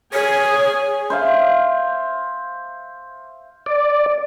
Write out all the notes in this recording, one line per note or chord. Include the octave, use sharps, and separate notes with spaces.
G#4 C#5 G#5
C5 E5 F5
D5